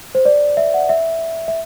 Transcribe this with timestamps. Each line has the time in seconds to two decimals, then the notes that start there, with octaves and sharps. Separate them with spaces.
0.15 C5
0.25 D5
0.57 E5
0.74 F#5
0.89 E5
1.48 E5